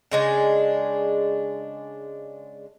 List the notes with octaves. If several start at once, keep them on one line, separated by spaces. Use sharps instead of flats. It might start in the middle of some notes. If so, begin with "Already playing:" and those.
C#3 G#3 D4